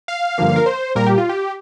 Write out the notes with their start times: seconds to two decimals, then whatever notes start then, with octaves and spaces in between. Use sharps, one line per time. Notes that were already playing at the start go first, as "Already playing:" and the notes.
0.08 F5
0.38 G2 D3 F3 A#3
0.56 A#4
0.66 C5
0.95 A#2 G3 A#3 A#4
1.06 G4
1.18 F4
1.29 G4